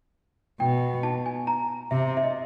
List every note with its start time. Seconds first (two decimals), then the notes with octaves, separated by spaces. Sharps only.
0.60 B2 G5
1.03 A5
1.26 G#5
1.47 A#5
1.91 C3 E5
2.17 E5
2.24 D#5